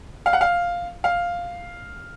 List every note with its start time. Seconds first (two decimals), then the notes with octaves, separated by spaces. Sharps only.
0.26 F5
0.33 F#5
0.41 F5
1.04 F5